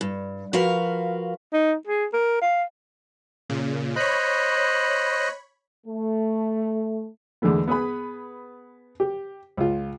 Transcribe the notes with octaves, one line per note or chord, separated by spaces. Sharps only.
G2
F3 F#4 A#4 B4 F5
D#4
G#4
A#4
F5
A#2 C#3
C5 C#5 D#5 B5 F#6
A3
E2 D3 G#3 A3 B3
B3 G#4 B4 B5
G4
C#2 F4